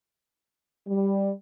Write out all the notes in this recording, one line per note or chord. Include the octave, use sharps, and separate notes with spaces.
G3